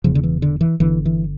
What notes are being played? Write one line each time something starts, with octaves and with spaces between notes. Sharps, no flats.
E1 E2 C#3 F3
D3
E3
D3
E3
G1 G2 D3 E3
E3